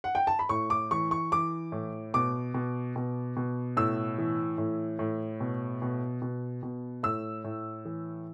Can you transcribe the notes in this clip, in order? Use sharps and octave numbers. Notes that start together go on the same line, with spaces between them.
F#5
G5
A5
B5
A2 C#6
D6
E3 C#6
C#6
E3 D6
A2
B2 D6
B2
B2
B2
A2 E6
E3
A2
A2
B2
B2
B2
B2
A2 E6
A2
E3